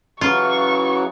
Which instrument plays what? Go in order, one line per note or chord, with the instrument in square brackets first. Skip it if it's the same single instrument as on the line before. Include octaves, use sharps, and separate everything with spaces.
[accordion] C#3 E3 F#3 [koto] F4 [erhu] C#6